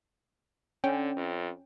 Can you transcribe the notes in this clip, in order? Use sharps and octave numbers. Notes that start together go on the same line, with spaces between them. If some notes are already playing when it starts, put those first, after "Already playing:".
D3 C#4 G5
F2